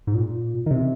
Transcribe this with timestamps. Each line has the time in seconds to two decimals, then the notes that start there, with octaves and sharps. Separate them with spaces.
0.07 G#2
0.15 A#2
0.66 D#3
0.71 C3